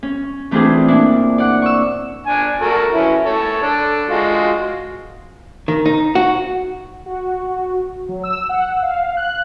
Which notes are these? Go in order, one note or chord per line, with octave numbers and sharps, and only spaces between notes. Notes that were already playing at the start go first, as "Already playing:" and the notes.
C#4
E3 A3 C4 D4 F4 G#4
A#2 D4 E4
D5 F#5
C#6 E6
D4 G#5
F#4 A4 A#4
E3 C#4 E4
A4 C#5
D4 A4
G#3 F4 F#4
D#3
D#4
F#4
F#4
F#3
E6
F#5
F5
F#6